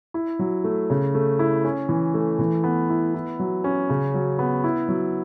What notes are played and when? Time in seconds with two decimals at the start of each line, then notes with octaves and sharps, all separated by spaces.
0.14 E4
0.39 F#3
0.64 A3
0.90 C#3
1.14 A3
1.39 E4
1.65 C#4
1.89 E3
2.14 A3
2.39 E3
2.64 B3
2.90 E4
3.14 E4
3.39 F#3
3.64 C#4
3.90 C#3
4.14 F#3
4.39 B3
4.64 E4
4.88 F#3